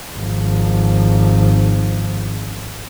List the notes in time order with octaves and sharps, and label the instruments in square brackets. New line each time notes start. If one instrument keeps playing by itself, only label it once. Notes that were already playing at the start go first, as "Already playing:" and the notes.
[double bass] G#1 F3